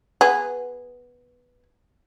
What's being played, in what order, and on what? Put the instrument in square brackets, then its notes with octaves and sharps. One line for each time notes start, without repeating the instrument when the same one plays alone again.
[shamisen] B3 G#4